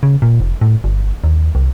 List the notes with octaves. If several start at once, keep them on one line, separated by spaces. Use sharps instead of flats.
C#3
A#2
F1
A2
G1
D#2
C2